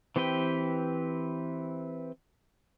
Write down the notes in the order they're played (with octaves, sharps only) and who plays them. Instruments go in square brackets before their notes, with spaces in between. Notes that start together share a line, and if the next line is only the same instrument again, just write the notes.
[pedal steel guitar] E3 C4 G4 B4 G5